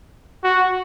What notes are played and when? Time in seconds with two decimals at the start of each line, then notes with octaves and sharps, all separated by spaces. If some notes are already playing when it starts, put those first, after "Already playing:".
0.44 F#4